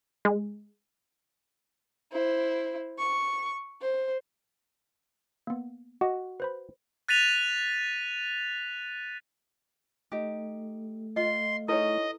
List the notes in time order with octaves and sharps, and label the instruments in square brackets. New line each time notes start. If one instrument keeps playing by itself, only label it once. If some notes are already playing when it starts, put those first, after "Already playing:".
[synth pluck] G#3
[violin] E4 C5
C#6
C5
[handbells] A#3 B3
[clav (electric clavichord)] F#4 [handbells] D#5 D6
[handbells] B4 C5 B5
[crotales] F#6 A6 B6 D#7 F7
[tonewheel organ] A3 [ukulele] D#4 G4
[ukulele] F4 [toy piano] D#5 [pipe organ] C6
[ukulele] D#4 G#4 C#5 [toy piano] E4 A4 B4 [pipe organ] D#5